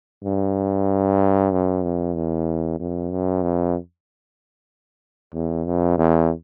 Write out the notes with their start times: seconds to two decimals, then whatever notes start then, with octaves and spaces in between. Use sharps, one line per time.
0.24 G2
1.52 F#2
1.84 F2
2.16 E2
2.79 F2
3.11 F#2
3.42 F2
5.33 E2
5.66 F2
5.98 E2